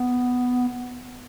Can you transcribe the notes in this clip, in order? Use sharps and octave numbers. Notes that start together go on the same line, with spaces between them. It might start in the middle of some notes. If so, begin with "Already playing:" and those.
Already playing: B3